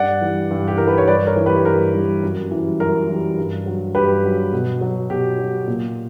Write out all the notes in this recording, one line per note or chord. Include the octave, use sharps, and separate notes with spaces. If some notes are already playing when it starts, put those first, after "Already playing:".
Already playing: G2 D5 F#5
E3 G3
G2
G4
E3 G3 A#4
B4
C#5
G2 B4 D5
A#4 C#5
E3 G3
G4 B4
G2 A#4
E3 G3
F#2
E3 G3
F#2 A#4
E3 G3
G2
F#3
G2 G4 B4
F#3
B2
F#3
B2 G4
F#3
A#2